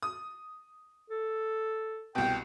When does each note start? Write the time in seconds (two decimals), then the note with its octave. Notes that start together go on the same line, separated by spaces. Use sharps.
0.03 D#6
1.10 A4
2.15 C2 B2 G5